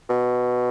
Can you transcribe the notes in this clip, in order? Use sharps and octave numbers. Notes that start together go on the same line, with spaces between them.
B2